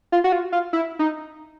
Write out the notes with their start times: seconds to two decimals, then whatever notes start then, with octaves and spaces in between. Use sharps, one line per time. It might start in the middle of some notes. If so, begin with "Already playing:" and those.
0.12 F4
0.24 F#4
0.32 F4
0.52 F4
0.73 E4
0.99 D#4